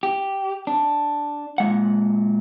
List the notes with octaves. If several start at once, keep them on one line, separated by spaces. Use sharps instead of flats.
G4
D4
A#2 G#3 F#5